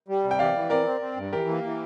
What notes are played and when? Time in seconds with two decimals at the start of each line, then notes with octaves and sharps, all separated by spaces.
0.08 G3
0.24 C3
0.31 G5
0.39 E3 D5 F5
0.55 E3
0.70 C4 A#4 D5
0.86 C4
1.01 C4
1.16 G2
1.32 E3 G4 A#4
1.49 A#3
1.64 E3